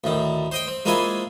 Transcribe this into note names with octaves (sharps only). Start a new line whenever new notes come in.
D2 A2 D#3
C5 D#5 G5
C4
G#3 A#3 C4 E4 F4 G#5